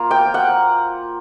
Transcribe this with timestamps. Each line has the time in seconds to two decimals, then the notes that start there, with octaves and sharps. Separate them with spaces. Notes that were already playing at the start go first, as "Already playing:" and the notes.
Already playing: A#3 F4 A#5
0.11 G5
0.34 F#5